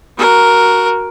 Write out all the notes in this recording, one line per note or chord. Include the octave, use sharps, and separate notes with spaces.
F#4 A#4